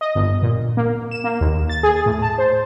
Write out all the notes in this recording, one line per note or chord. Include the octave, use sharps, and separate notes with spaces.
D#5
G1
A#2
A#3
E7
A#3
D#2
A6
G#4
A2
A5
C5